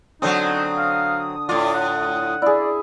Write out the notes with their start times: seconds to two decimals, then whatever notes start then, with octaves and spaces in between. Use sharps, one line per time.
0.22 D3 F#3 C4 D#4 C#6 D#6
0.77 F5
1.49 A2 F4 D5
1.75 F#5
2.42 E4 G#4 D5